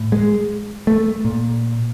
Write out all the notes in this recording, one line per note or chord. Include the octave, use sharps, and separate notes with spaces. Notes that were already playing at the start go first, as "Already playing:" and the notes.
Already playing: A2
G#3
A3
A#2